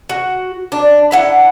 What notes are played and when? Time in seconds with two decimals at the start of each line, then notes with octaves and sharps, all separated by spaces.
0.09 F#4
0.72 D4
1.11 D4 E4 F#5